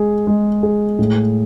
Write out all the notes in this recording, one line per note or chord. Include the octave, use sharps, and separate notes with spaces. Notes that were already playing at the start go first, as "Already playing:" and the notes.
Already playing: G#3 G#4
G#3
G#4
A2